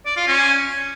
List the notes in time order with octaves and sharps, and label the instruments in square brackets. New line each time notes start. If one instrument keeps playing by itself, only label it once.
[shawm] D5
F4
C#4